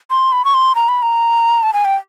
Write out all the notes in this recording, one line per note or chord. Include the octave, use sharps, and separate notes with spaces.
C6
B5
C#6
C6
A#5
B5
A#5
A5
G#5
G5